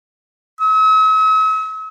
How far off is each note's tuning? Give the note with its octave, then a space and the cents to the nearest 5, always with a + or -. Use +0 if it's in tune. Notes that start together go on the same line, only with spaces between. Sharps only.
E6 -45